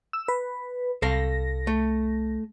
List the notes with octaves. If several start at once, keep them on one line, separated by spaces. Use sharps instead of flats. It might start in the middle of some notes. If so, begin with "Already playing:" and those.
E6
B4
C2 A4 F5 A#6
A3